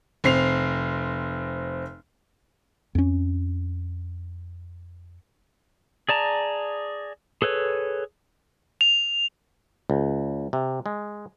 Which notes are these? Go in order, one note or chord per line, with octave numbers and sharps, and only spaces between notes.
F1 C4 C7 F7
F2 C#4
G#4 D5 A5 A#5
G#4 A4 B4 C#5
F7
C#2
C3
G#3